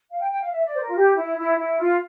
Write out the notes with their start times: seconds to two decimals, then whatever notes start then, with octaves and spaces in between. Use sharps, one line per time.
0.10 F5
0.20 G5
0.31 G5
0.42 F5
0.52 E5
0.66 D5
0.74 C5
0.80 A#4
0.88 F4
0.95 G4
1.16 E4
1.37 E4
1.59 E4
1.80 F4